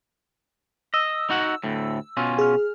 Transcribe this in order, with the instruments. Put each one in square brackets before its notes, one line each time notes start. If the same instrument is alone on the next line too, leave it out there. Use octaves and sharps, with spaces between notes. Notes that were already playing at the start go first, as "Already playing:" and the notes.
[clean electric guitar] D#5 [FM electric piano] E6
[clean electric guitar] D#4 F#4 F#5
D2 A2
B2 C#4 F4
[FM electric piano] G#4 F6